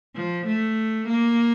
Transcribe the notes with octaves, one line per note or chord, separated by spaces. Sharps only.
F3
A3
A#3